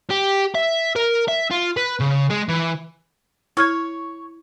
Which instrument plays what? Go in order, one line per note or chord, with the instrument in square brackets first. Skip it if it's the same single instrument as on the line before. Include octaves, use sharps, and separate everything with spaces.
[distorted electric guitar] G4
E5
A#4
E5
F4
B4
C#3
G#3
E3
[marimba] E4 F6 G#6 [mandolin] C#5